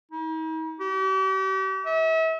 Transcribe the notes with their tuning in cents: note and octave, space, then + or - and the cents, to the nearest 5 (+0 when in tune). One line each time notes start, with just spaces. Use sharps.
D#4 +45
G4 -40
E5 -35